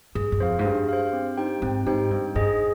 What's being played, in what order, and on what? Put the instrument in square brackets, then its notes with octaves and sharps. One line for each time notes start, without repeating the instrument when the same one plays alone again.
[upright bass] G2 [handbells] G#4
[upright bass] G2
[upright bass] F2 [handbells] C5 F5
[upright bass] G#2
[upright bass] G2 [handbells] G#4
[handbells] C5 F5
C4
D#4 G4 C5 G5
[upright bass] G#2 [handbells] C4
[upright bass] G#2 [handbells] D#4 G4 C5 G5
[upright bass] G2 [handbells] D#4
[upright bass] G2 [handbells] G#4 C5 D#5 G#5